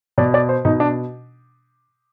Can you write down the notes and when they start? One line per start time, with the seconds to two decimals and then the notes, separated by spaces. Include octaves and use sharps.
0.18 B2 D5
0.34 D5
0.49 C5
0.65 B2 D#4
0.80 D4